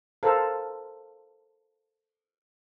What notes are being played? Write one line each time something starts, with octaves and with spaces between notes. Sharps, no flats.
A4 A#4 C5 F5